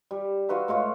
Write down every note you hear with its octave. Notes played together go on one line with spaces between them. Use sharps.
G3
F4 F#4 B4 E5
A2 G#3 F4 C#5